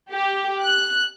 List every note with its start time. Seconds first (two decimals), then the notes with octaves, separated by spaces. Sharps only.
0.11 G4
0.62 F#6